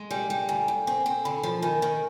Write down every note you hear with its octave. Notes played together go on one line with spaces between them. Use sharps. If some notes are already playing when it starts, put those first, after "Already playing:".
Already playing: G#3
G3 G#5
G3 G5
D2 G#5
D2
C4 G#5
C4
D3 B5
F3 B5
D#3 G#5
D#3